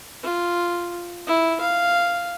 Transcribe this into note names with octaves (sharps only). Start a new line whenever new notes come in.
F4
E4
F5